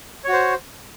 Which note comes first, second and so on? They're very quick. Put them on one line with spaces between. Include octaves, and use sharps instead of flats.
C#5 F#4 C5